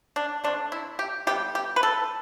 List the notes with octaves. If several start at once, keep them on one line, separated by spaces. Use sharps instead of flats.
D4
D3 A3 C4 D4
E4
G4
D3 G3 B3 G4
G4
B4
A4